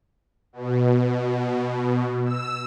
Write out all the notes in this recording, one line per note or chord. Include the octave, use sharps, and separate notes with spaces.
B2
E6